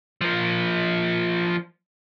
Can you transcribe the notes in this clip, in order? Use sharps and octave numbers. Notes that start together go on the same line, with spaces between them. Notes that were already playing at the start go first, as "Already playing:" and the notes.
F3 A#3